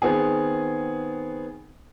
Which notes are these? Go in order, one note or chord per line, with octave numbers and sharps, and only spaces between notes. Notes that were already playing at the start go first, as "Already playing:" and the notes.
D#3 B3 C4 G#4